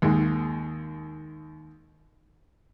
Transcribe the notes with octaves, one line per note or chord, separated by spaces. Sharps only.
D#2 G#3